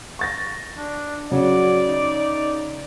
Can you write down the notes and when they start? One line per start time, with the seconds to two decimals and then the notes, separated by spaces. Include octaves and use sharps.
0.19 C#6 A6 A#6
0.77 D4
1.32 C#3 F#3 D5
1.88 D#4